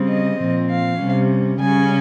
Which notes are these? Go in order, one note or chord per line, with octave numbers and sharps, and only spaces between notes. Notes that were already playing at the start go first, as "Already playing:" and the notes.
Already playing: C#3 G3 C4
D#5
A#2 F3 C4
F5
C3 G3 C#4
C#3 G3 C#4 G#5